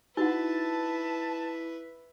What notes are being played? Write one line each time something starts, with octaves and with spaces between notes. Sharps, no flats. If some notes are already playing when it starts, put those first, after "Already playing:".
D#4 E4 F#4 B4 E5 F#5 A5